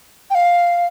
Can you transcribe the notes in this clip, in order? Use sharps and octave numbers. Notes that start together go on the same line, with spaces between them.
G5
F5